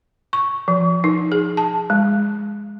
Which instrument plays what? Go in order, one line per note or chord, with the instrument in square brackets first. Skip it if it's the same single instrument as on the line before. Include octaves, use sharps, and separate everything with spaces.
[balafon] C#6
F3
D#4
G#4
A5
G#3